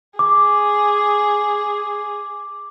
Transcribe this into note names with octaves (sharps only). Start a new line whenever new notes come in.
G#4 D6